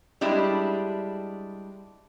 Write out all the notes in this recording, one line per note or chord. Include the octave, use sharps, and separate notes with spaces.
G3 G#3 D4 E4